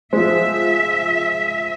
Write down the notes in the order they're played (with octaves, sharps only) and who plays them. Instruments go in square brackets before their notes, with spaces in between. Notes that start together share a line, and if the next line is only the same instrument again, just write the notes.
[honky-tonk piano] F3 G#3 [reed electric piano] C5 [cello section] E5